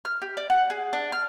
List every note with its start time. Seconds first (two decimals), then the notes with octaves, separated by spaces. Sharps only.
0.05 F6
0.22 G4
0.37 D5
0.50 F#5
0.70 G#4
0.93 D4
1.12 F6